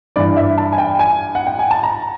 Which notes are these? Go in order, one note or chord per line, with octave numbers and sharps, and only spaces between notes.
G2 E3 D5
E5
A5
G#5
G5
G#5
F#5
G5
G#5
A5
A#5